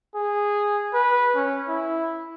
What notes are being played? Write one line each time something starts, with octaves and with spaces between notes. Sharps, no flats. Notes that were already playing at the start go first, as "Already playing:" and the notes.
G#4
B4
C#4
E4